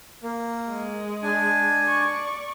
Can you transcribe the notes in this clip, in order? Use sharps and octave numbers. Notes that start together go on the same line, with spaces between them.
A#3
G#3
D4 G#5
D5 C#6